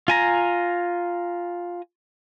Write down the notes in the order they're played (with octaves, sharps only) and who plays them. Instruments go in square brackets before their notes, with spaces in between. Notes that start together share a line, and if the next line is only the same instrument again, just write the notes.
[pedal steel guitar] F4 G#5 A#5